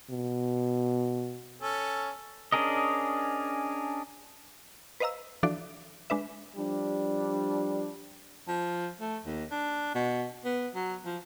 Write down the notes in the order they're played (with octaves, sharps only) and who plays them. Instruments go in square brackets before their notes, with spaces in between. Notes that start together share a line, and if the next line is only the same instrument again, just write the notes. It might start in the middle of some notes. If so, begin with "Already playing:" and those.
[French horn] B2
[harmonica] C#4 A4
[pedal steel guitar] C#4 D4 G#4 A#4 D#5
[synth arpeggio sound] B4 C5 D#5 F5 A#5 E6
E3 F3 D4 F#4 A4 D5
G#3 D4 B4 E5
[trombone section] F3 G3 D4
[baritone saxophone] F3
A3
D#2
D4
B2
B3
F#3
F3